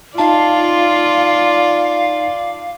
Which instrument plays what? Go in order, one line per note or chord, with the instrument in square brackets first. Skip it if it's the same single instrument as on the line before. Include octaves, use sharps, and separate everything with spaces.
[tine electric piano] D#4 A5 [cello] F4 [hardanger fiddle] D5 [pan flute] F5